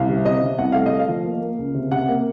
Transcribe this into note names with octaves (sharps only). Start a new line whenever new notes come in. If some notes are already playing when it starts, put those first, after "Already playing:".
Already playing: C2 F5
C3
C3 D#5
C3
C2 F#5
A3 F5
D#5
A3
F5
F3
A#3
A#3
C#2
C3
C3 F#5
A#3